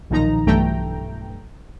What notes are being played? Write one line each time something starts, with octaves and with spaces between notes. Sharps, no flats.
B1 A#2 D#3 F3 D#4 A#5
B1 G2 E3 A3 G5 A#5